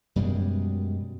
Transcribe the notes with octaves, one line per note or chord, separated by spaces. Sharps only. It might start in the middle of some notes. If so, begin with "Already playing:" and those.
F#2 B2 G3 G#3